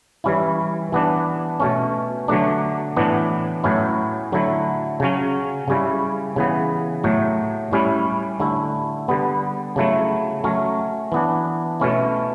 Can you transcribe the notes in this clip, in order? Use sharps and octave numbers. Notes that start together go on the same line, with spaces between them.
E3 G3 C#4 E4
E3 B3 D4
B2 A3 C#4
D3 F#3 A3 D4
A2 E3 B3 D4
A2 F#3 C#4 E4
D3 F#3 A3 E4
C#3 F#3 C#4
C#3 G3 C#4 E4
C#3 E3 B3
A2 F#3 A3
A2 G3 C#4 E4
D3 A3 E4
D3 G3 B3
C#3 F#3 A3 E4
F#3 A3 C#4
E3 B3 D4
B2 A3 C#4 E4